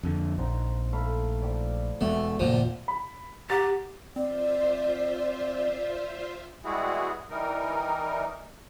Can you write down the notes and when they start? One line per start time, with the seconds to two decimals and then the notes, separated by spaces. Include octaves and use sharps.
0.03 F2 D3
0.38 A#1 C4 D#4 A#5
0.93 A3 F5 B5
1.42 F3 G4 D5
2.01 E1 G#3 A3 B3 F#4 E5
2.40 F#1 D#2 A#2 F3
2.88 B5
3.50 G4 F#5 A#5 A6
4.16 C4 F4 C5 D5 E5
6.65 G3 G#3 B3 E4 F#4 G#4
7.30 E3 G3 D#4 A#4